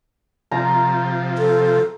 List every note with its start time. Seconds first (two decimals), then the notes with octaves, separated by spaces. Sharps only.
0.51 C3 F3 A#5
1.38 A4